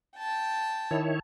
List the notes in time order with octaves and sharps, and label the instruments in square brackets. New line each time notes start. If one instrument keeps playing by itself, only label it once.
[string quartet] G5 A5
[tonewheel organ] D#3 E4 C#5